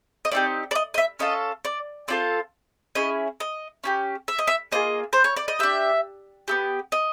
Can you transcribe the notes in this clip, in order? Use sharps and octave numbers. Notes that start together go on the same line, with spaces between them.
D#5
A3 C4 D#4 G4 D5
D5
D#5
D#5
E5
C#4 F4 A4 D#5
D5
C4 F4 A4 D5
C#4 E4 G#4 D#5
D#5
C#4 E4 G4
E5
D#5
E5
A#3 D4 F4 G#4 D#5
C5
C#5
D5
D#5
D4 G4 E5
B3 E4 G4
D#5